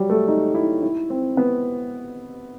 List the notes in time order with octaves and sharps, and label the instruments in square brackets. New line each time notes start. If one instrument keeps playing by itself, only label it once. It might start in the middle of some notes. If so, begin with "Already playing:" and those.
Already playing: [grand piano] F#3 G3
A3
D#4
E4
E4
C4
B3